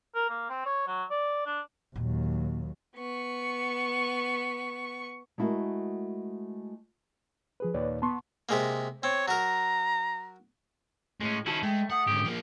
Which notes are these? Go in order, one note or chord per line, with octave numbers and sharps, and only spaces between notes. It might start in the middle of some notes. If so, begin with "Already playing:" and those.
A#4
A#3
C4
C#5
F#3
D5
D4
D#2 A#2 F#3
B3 C#6
G#3 A3 E4 F#4 A#4
F3 G#4 B4
D#2 A#2 B4 C#5 D5
B3 A5 C6 C#6
C3 G#3 A#3
C4 C#5
F#3 A#4 A#5
A2 G#3 C#4
D#3 C#4 E4 F#4 A5
G#3 A3 G5
F#5 D#6
G#2 D3 G4
F3 A#3